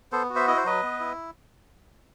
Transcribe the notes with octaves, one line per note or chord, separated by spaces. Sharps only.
B3 A4 C5
F#4
C5 E5
E4 D#5
C5
F#3 B4 D#5
B3
E4